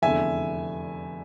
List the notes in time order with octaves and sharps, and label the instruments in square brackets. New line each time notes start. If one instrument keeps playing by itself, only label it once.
[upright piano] F1 E2 D3 [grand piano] E5 G#5